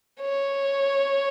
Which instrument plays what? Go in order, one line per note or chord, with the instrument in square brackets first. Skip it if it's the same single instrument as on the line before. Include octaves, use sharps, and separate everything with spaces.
[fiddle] C#5